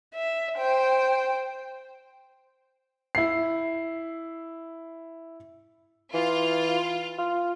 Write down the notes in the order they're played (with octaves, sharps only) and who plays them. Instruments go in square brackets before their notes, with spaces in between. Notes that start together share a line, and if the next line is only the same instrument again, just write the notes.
[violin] E5
C5 G5
[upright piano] E4 C7
[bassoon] E3 [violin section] F4
[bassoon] F4